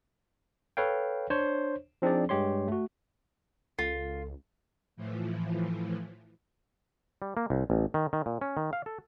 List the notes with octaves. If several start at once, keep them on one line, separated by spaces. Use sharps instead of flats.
A4 B4 C#5 F5 G5
D4 C5 C#5
F3 C4 D4 D#4 G#4 D5
G2 G#3 G4 C#5 C6
A3 F#4
C#2 F4 A4
A2 E3 F3
G3
A#3
C2
A1
D#3
D#3
A#2
C#4
D#3
F5
A4